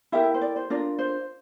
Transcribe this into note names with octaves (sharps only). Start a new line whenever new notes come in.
E4 G4 A#4 E5
C5
D5
C5
D4 F4 A#4 D5
C5